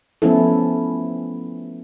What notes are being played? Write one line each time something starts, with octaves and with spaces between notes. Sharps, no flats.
F3 A3 B3 C#4 E4 A4